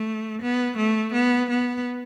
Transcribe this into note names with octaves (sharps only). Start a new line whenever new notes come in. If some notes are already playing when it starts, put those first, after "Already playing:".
Already playing: A3
B3
A3
B3
B3